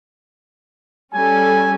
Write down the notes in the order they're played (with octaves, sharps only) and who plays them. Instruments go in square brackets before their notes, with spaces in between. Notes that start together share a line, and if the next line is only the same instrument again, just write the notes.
[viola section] G3 C#4 A4 [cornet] G#5